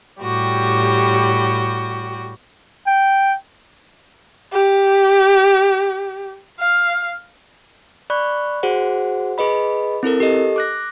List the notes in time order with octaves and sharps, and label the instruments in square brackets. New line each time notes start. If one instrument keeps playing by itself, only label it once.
[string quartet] A2 G3 F#4 G4
[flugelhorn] G5
[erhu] G4
F5
[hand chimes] D5 B5 C#6 F#6
F#4 G#4 C5 F#5
G#4 B4 D#5 B5
C4 E4 A4 A#4
G4 A4 D#5
D6 F#6 A#6